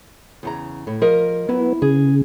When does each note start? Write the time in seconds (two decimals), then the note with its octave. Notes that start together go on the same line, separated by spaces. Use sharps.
0.43 E2 C#3 A#5
0.87 A2
1.01 F3 A#4 D#5
1.49 F#3 B3 E4
1.82 C#3 G#4